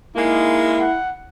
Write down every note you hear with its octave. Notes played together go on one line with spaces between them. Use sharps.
G#3 A#3 D#4 E4
F#5